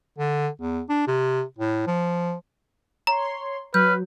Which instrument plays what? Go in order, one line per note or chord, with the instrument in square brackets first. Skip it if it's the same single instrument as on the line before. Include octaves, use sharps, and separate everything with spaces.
[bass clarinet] D3
E2
D4
C3
A2
F3
[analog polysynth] C#5 C6 [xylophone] A#5
[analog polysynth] F#3 [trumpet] B4 [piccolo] F6 [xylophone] G6